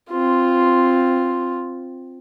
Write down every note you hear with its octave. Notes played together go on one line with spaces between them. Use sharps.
C4 F4